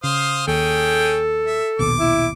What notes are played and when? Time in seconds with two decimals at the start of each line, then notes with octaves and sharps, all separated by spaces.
0.03 C#3 C5 F5 D#6
0.47 D#2 C#4 G#4 A4 G5
1.46 E5
1.79 A#1 D#2 B2 D6
1.99 E4